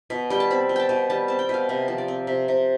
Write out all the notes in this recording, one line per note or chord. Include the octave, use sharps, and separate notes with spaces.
B2
G3 G5
A5
C4 B5
B2
G5 A5
B2
G3 A5
C4 A5
G5
B2 F5
C3
F3
D5
C4
C3
C3